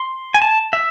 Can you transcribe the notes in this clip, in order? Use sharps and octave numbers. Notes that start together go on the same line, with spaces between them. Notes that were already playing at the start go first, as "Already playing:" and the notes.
Already playing: C6
G#5
A5
E5